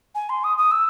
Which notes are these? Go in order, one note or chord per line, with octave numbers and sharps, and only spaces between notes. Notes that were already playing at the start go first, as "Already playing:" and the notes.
G#5
C6
D#6
D#6
E6